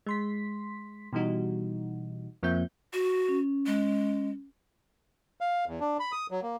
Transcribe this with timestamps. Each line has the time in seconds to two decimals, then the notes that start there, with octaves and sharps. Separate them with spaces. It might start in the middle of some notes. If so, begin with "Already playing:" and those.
0.07 G#3 C6 B6
1.13 B2 E3 G3 D#4 F#4
2.43 F2 F3 A#3 C4 E5 G6
2.94 F#4
3.29 C#4
3.66 G#3
5.41 F5
5.67 E2
5.80 D4
6.00 B5
6.12 D#6
6.31 F#3
6.42 A#3